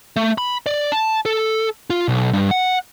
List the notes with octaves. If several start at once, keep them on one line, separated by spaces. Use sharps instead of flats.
A3
B5
D5
A5
A4
F4
B1
G2
F#5